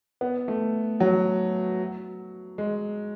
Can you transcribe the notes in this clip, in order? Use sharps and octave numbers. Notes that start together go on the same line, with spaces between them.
B3
A3
F#3
G#3